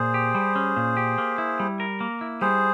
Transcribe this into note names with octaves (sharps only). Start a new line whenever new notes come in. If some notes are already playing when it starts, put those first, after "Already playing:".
Already playing: A#2 G#4 C5
G4
G3
C#4
A#2
G4
A#3
E4
G3
A#4
A#3
E4
G3 G#4 C5